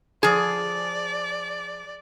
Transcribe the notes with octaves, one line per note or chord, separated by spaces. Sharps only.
F3 G#4 D5